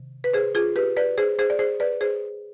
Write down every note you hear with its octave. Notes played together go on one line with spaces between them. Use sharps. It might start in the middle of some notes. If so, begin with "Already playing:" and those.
Already playing: C3 D#3
B4
G#4 C5
F4 G#4
G4 B4
B4 D5
G#4 C5
G#4 C5
D5
G#4 C5
B4 D5
G#4 C5